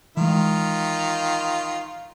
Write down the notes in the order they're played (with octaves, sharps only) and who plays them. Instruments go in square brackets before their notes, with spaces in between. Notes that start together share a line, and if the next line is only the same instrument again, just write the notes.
[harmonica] D#3 F4 [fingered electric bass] E3 G#3